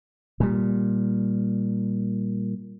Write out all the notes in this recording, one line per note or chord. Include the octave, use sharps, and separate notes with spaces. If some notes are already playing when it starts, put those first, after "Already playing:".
A#2 G3